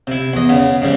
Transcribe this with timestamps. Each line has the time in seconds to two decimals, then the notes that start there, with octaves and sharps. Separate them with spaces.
0.07 C3 E4
0.33 E2 D#5
0.49 C#3 B3
0.82 G#2 C#3 G3